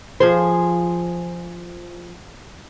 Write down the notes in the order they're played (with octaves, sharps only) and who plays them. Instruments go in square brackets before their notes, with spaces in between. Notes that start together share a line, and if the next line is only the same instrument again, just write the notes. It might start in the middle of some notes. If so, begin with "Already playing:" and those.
[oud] F3 G#4 C5